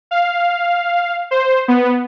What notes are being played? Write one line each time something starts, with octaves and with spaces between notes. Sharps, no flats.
F5
C5
B3